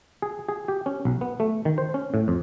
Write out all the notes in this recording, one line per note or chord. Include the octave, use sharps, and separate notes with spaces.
G#4
G#4
G4
C#4
B1
B3
A3
D#3
C5
C#4
A2
F2